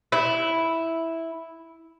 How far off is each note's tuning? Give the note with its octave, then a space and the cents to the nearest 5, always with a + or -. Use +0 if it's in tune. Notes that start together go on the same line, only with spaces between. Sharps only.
E4 -5